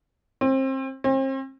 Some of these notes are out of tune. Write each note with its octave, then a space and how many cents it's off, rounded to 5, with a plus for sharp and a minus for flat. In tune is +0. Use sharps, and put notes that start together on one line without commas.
C4 +30
C4 +40